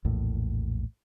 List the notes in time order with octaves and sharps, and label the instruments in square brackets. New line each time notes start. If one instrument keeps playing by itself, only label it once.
[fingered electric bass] A#1 E2 A2